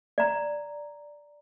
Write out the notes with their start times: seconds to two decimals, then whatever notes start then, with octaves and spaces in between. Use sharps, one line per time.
0.18 D5 A#5